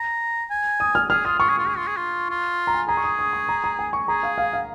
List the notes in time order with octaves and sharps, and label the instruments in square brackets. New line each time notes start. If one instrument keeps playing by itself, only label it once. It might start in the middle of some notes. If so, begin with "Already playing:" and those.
Already playing: [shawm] A#5
G#5
[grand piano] D#6
F6
[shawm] G#4 [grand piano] F6
[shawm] F4 [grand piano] D#6
[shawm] F4 [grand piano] C#6
[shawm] G#4
F4
G#4
F4
G#4
F4
F4
[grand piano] A#5
G#5
[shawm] G#4 [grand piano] A#5
[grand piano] C#6
D#6
D#6
C#6
A#5
A#5
G#5
C#6
[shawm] G#4 [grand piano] A#5
[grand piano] F5
F5
F5